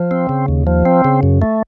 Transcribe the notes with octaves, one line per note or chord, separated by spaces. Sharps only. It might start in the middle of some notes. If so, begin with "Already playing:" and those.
Already playing: F3
C4
C#3
D#2
F3
C4
C#3
F#2
A3